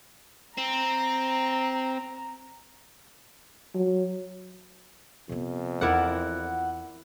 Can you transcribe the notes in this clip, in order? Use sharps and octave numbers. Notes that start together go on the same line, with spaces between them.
C4 A#5
F#3
F2 C3 B3
E2 D#4 E4 A#4 D5 F#5